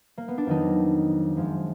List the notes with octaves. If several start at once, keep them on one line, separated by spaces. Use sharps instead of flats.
A#3
B3
D4
F2 D#3 F#3 D#4
F#2 F3 G#3